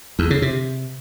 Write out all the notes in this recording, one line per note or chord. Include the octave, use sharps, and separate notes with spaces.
E2
C#3
C3